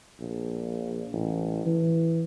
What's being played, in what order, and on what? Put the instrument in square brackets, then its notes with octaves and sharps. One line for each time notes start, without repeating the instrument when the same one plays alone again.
[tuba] A#1
A1
E3